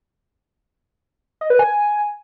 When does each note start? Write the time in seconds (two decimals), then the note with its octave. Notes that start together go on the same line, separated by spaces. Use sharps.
1.41 D#5
1.50 B4
1.59 G#5